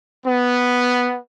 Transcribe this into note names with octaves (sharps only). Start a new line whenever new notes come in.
B3